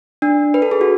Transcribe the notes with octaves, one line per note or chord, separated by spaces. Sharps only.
D4
B4
A4
G#4
F#4